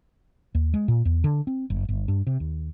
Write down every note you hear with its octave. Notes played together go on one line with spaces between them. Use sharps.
D#2
G#3
A#2
E2
D3
C4
F#1
G1
G2
C3
D#2